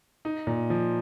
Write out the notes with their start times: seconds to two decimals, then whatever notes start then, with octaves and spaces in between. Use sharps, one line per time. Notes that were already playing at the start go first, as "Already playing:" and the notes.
0.25 D#4
0.47 A#2
0.70 F3